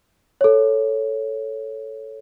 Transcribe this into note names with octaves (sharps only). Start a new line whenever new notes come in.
A4 C#5